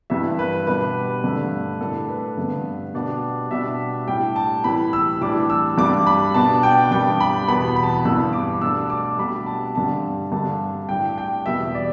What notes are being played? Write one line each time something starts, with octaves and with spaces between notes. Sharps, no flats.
G2 E3 G3 E5
B4
B2 G3 D4 B4
G2 D3 A3 D4
A2 A3 D4 A4
B4
G2 D3 B3
B2 G3 B3 D4
B2 G3 D4 E5
A2 G3 D4 G5
A5
A2 E3 G3 B5
E6
A2 E3 G3 D4 D6
E6
G2 G3 D4 D6
B5
B2 B3 D4 A5
G5
G2 G3 B3 D4 G5
B5
E2 B2 B3 B5
B5
A5
B5
G2 E3 B3 E6
D6
B2 A3 D4 E6
D6
B2 G3 D4 B5
A5
G2 D3 G3 D4 A5
G2 D3 G3 D4 A5
A2 G3 D4 G5
G5
E2 B2 G3 B3 E5
D5